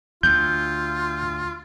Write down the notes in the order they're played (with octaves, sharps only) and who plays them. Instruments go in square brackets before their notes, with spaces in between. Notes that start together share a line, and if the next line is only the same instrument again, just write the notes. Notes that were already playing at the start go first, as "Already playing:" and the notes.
[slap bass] D2 [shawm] F4 [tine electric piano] G6